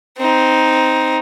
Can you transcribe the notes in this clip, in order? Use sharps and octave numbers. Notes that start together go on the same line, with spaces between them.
C4 D#4